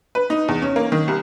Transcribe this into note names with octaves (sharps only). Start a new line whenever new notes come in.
B4
D#4
E2
C#4
A#3
D#3
C2